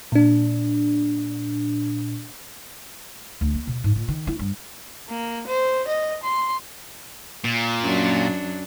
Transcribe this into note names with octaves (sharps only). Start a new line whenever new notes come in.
A#2 D4
D2
A#3
B2
G#2
A#2
D#3
E4
G2
A#3
C5
D#5
C6
A#2
F#2 F#3 D4